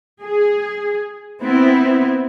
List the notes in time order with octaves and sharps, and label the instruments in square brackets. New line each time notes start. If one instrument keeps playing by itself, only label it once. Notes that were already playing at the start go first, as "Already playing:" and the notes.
[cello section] G#4
B3 C4 E4